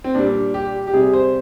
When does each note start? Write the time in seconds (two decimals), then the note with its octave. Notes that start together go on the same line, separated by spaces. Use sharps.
0.04 C4
0.15 A#2 G3 D4
0.54 G4
0.87 G4
0.93 C3 G3 G#4
1.14 C5